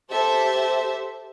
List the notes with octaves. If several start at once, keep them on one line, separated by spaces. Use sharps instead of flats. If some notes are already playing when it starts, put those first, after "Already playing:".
G4 A4 C5 E5